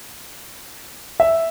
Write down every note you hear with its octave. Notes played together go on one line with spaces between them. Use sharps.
E5